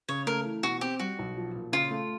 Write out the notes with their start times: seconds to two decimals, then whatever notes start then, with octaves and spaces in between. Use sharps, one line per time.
0.09 C#3 C#5
0.27 A3 A#4
0.45 E3
0.63 B2 F#4
0.81 C4 G4
0.99 G3 F#4
1.19 B1
1.37 F3
1.55 A#2
1.72 C#3 F4
1.91 A3